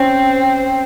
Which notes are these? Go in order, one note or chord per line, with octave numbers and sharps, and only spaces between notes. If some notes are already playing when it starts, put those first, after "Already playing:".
Already playing: C4 C#4